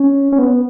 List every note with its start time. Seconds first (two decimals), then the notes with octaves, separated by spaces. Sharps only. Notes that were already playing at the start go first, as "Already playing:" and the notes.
Already playing: C#4
0.32 C#4
0.39 B3